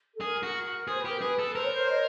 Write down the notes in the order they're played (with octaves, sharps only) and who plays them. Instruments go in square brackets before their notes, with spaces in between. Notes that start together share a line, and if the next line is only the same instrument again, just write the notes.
[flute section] A4
[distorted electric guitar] G#4 [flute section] A#4
[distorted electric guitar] F#4
[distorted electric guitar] G#4 [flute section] C5
[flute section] B4
[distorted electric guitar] G4 [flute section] A#4
[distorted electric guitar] G#4 [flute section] B4
[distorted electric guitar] A4
[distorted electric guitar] A#4 [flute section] C5
[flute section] C#5
C5
C#5 D#5